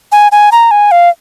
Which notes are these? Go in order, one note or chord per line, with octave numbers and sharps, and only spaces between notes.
G#5
G#5
A#5
G#5
F5